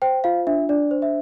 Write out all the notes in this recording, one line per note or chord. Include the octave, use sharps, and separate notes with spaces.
C5 G5
F4 F5
D4 E5
D4 D5
C5
E5